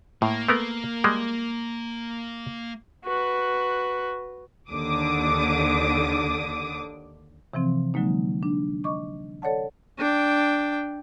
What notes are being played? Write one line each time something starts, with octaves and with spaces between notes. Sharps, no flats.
A2 A#3
A3 B3 A#4
G3 G#3
F#4 B4
D#2 D3 D6 D#6
C3 E3 F3 C4
D3 F#3 G#3 A#3 D#4
D4
D#5 C#6 D6
A4 C#5 D5 F#5 A5
D4 G5